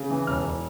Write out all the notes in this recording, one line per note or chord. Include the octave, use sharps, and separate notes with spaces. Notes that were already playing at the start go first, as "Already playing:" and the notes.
Already playing: C#3
E3
E1 F6
E1